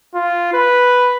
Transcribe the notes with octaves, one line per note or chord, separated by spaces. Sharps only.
F4
B4